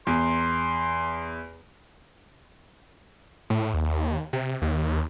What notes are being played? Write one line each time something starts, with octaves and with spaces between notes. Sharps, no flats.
E2 C6
A2
D#2
C3
D#2